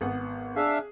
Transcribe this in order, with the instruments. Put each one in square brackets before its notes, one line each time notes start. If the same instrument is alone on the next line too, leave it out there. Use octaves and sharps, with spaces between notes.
[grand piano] G#1 B3 F#5
[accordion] D4 E5 F5 [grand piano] G#4